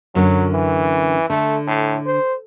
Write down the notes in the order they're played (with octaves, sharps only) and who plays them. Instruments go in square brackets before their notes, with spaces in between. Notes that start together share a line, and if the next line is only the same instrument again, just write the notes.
[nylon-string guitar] F#2 D3 C#4 [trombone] F#3
[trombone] E3
[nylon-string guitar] D3 [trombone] A3
[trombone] A2
C5